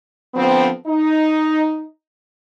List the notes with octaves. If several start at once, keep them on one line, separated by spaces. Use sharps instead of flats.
D3 F3 B3 C4
D#4